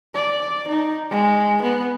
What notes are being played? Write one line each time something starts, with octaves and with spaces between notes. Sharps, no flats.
D5
D#4
G#3
B3